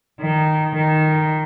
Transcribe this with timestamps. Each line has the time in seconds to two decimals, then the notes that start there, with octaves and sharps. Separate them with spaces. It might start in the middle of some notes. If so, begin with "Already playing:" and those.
0.20 D#3
0.75 D#3